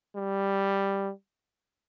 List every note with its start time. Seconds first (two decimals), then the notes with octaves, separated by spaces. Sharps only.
0.16 G3